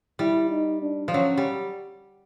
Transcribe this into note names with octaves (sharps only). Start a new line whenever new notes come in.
G3 E4
D#4
D4
F3
F#3 C#4
G3